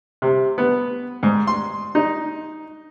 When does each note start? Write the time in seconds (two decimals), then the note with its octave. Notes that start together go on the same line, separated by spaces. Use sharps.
0.22 C3
0.58 B3
1.23 G#2
1.47 C6
1.95 D#4